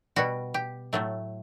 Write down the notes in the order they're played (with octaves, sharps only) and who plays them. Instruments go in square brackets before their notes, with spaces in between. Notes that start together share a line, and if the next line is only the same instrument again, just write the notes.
[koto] B2 G3 F#4
G4
A2 F#3 A3